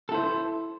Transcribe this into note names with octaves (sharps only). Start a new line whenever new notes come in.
E4 A4 C5